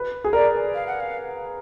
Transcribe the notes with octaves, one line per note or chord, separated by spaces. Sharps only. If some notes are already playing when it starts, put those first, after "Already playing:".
Already playing: B4
G#4
A#4 D5
F5
F#5
F5